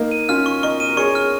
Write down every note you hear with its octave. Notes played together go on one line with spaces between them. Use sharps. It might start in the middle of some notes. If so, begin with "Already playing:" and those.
Already playing: A#3 D#4
D#7
C#4 F4 F6
C#6
A#4 D#5 C#6
D#7
A#4
G#4 C#5 C#6
F6